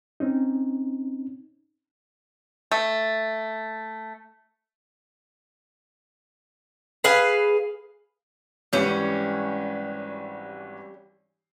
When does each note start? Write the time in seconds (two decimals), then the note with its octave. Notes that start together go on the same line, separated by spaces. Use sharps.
0.20 C4 C#4 D#4
2.71 A3
7.04 G#4 B4 F5 G#5
8.73 G#1 E3 G3 C#4 G4